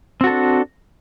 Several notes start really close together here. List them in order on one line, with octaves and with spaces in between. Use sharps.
C4 F#4 A4 D4